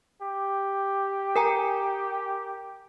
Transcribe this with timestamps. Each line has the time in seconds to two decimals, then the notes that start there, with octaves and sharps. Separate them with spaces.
0.21 G4
1.36 A#4 G#5 A#5